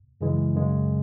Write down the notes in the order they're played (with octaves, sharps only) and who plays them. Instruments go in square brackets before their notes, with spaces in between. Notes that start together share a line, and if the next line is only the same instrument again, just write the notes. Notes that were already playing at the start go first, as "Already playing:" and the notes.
[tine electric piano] F#2 C#3 E3 G#3
F#2 C#3 G#3